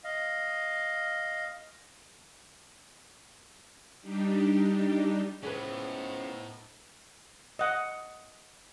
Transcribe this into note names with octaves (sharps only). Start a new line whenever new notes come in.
D#5 F5
G3 D4 D#4 G4
A2 B3 C#4 D#4 F4 G#4 B4 C5
D#5 F#5